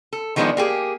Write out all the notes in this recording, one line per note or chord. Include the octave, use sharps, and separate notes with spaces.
A4
D#3 F3 G#3 B3 D4 D#4
A#3 G4 G#4